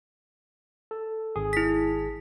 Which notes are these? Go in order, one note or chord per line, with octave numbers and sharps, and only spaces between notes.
A4
G#1 G#4
E4 B6